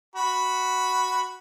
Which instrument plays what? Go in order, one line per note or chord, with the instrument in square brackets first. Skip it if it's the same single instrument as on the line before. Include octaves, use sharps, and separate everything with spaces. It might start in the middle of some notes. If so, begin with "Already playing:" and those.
[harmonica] F#4 B5